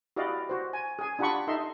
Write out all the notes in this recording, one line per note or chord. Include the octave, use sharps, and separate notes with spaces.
E4 F#4 G4 D5 D#5 F5
F#4 C5
G#5
G#4 G#5
D4 F4 G4 F#5 B5 C#6
D#4 A4 D#5 E5 C6